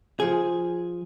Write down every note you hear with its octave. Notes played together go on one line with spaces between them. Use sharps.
F3 G#4